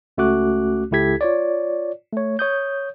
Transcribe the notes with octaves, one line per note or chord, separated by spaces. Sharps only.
C#2 A3 C#4 F#4 D6 F#6
C#2 E4 G4 A4 G#6 B6
F4 C#5 D5
A3 C#5
C#5 D#6 G6